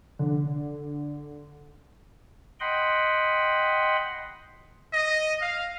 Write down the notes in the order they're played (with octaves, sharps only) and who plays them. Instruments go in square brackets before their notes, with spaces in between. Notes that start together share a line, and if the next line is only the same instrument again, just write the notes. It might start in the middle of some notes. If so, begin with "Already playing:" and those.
[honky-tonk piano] D3
[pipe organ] D#5 F#5 G5 B5 C6
[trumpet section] D#5
F5